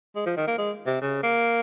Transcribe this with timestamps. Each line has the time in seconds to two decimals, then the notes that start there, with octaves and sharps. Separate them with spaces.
0.16 G#3
0.26 F3
0.37 D#3
0.48 A#3
0.58 G#3
0.87 C3
1.02 C#3
1.23 A#3